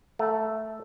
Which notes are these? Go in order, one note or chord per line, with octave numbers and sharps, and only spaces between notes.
A3